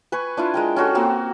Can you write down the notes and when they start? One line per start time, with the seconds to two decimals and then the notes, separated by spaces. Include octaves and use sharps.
0.12 B4 G#5 B5 C#6
0.37 D4 E4 F4
0.54 G#3 A#4 G5
0.76 C#4 F4 F#4 A4
0.95 A#3 C4 F#4